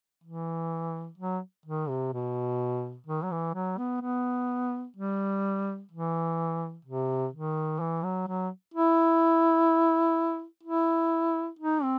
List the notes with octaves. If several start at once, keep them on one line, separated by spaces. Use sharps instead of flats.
E3
F#3
D#3
C3
B2
D#3
F#3
E3
F#3
B3
B3
G3
E3
C3
D#3
E3
F#3
F#3
E4
E4
D#4
C4